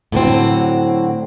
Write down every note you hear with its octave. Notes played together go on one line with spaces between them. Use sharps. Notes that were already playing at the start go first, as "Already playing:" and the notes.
A2 D3 F#3 C4